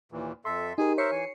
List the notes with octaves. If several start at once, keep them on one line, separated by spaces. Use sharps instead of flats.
D#2 A#2 E3
F2 A4 E5 C6
D#4 G4 G#4 A#4 G#5
A#4 C5 C#5 E5 C7 C#7
E3 G#5